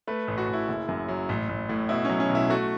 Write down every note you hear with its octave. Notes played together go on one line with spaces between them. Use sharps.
A3 B4
A1
F#4
A1
E4
F#1
F#2
F#3
A1
A1
A2
B2 E4
F#3 C#4
C#4
B1
E4
A3 F#4